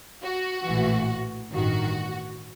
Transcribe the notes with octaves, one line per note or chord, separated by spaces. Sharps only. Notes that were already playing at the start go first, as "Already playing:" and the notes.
F#4
A#1 A2 E3
A1 G2 D#3 F#4